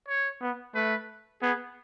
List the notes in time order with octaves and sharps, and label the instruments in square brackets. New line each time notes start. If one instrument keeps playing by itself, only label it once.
[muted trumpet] C#5
[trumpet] B3
[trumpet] A3 [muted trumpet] B4
[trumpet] B3 [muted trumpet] G#4